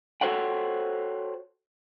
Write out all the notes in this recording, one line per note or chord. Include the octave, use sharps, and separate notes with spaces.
F#4 A4 C5 C#5 F#5 G5